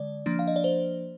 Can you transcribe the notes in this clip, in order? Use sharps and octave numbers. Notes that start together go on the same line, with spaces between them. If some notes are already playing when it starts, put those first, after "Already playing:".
Already playing: D3 G#3 D5
F3 A#3 D4
F5
D#5
D5
C5